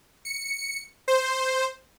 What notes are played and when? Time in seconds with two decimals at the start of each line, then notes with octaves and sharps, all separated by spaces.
0.25 C#7
1.08 C5